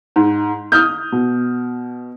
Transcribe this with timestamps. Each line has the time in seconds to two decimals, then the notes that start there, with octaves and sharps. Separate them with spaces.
0.16 G#2
0.72 D#6 F6 G6
1.12 B2